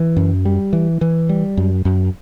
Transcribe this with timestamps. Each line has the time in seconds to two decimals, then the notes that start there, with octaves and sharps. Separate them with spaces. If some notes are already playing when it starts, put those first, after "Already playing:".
Already playing: E3
0.16 F#2
0.45 G3
0.73 E3
1.01 E3
1.29 G3
1.57 F#2
1.85 F#2